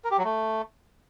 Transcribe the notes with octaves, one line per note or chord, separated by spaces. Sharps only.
A#4
G4
F#3
A3